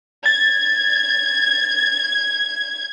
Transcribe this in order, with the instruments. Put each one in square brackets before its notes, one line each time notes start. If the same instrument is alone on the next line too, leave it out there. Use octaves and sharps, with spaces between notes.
[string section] G#6 [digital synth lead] A6